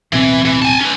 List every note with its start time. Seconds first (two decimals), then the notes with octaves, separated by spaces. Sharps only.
0.13 D1 B2 E3 C4
0.45 E3
0.62 G#5 A5
0.81 C#4 B4